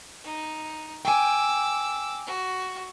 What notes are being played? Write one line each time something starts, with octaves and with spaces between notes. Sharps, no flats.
D#4
G5 G#5 D6 E6
F#4